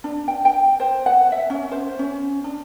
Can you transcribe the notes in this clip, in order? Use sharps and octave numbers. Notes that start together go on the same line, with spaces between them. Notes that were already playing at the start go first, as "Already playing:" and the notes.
D4
G5
G5
C5
F#5
E5
C#4
C5
C#4
D4